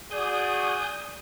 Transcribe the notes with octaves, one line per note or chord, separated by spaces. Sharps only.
F#4 G#4 D5 G#5 D#6 G6